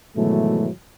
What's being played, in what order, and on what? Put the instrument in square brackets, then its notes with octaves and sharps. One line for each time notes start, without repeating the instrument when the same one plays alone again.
[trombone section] G#2 B2 D#3 E3 F#3 A3